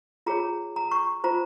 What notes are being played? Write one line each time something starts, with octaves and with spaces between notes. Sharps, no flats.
F4 G#4 C#5 A#5
A#5
C#6
F4 C5 A#5